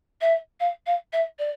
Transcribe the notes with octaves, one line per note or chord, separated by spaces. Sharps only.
E5
F5
F5
E5
D5